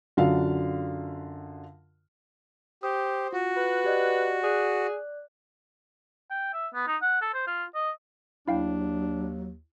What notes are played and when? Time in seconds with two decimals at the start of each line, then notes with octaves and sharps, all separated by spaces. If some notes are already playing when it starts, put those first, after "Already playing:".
0.17 F#2 D3 F4 F#4 F5
2.83 G4 C5 D#6
3.33 F4 F#4
3.56 B4
3.84 G4 D5 D#5
4.43 G#4 D5 F#6
6.31 G5
6.53 E5
6.74 B3
6.87 D#4
7.02 F#5
7.21 A4
7.34 C5
7.47 F4
7.75 D#5
8.48 D#2 F#3 D4 E4 F5 G5